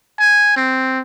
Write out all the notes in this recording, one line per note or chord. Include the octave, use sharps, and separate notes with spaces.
G#5
C4